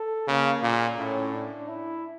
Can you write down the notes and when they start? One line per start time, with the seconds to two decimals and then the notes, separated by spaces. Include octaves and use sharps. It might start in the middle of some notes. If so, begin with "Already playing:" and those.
Already playing: A4
0.27 C#3 A#3
0.63 A#2
0.99 A2 C#4
1.34 D4
1.68 E4